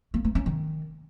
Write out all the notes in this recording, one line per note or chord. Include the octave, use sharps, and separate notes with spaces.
A#3
A3
C#4
D#3